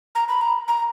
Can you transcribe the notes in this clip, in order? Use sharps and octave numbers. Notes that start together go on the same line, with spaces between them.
A#5
B5
A#5
A#5